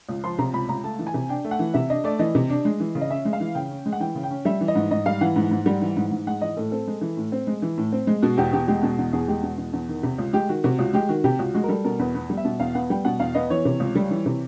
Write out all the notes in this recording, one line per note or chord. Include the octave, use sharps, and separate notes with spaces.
C#2
F3 C6
C3 A#5
C#2 B5
C#2 A#5
A3 A5
E3
G#5
C3
D4 G5
A3
F#5
E3
C3 E5
D4 D#5
A3 D5
E3 D#5
C3
D4
G#3
E3
C#3
D#5
C#4 E5
G#3
F5
E3
C#3 G5
C#4
G#3
F#5
E3 G5
C#3
G5
C#4
G3 E5
E3
D#5
G#2
G#2 D#5
G3 F5
E3 F#5
G#2
G#2
G3
E3
G#2
G#2
G#3 F#5
E3 D#5
A2 A4
C4 A4
G#3
E3
A2
C4
G#3
E3
A2
C4
G#3
B2 F#4
E2 G4
E2 G4
G#3 G4
B2 F#4
E2
E2 G#4
G#3 G4
B2
E2
E2
D#3
C3
C#2
G#3 G4
D#3 F#4
C3 F#4
C#2 F#4
G#3 G4
D#3 F#4
C3 G4
C#2 F#4
G#3 F#4
A#4
G3 A4
B2 A#4
E2 B4
B3 B4
G3
E5
B2
E2 F5
B3 F#5
G3 G5
B2 F#5
E2 F5
B3 D#5
E3 C#5
C3
C#2
G3
E3
C3